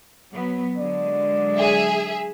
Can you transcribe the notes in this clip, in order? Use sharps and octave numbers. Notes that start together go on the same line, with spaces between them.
F#3 B3
D3 F#3 G#3 D5
G#4 E5